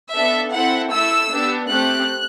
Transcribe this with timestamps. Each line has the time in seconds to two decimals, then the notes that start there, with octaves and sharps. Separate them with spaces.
0.13 B3 D4 A4 E5
0.52 C4 E4 A4 F#5
0.91 A3 E4 A4 E6
1.31 B3 D4 G4
1.70 A3 C4 G4 F#6